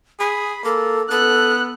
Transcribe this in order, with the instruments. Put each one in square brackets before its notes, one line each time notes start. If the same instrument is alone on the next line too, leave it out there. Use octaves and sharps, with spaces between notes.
[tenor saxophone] G#4 [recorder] B5
[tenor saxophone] A#3 [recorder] A4
[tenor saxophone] B3 [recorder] A4 [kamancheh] F#6